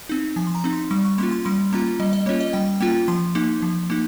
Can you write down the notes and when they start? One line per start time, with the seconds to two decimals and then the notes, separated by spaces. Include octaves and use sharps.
0.09 C4 D#4
0.36 F3 G#5
0.47 C6
0.55 A#5
0.64 C4 D#4
0.73 C6
0.91 G3 C#6
1.05 C#6
1.18 A#3 C#4 F4 C6
1.31 C6
1.45 G3 C6
1.73 A#3 C#4 F4 A#5
2.00 G3 D#5
2.13 D#5
2.26 A#3 C#4 F4 C#5
2.41 D#5
2.53 G3 G5
2.80 A#3 C#4 F4 G5
3.08 F3 C6
3.35 A#3 D#4
3.62 F3
3.90 A#3 D#4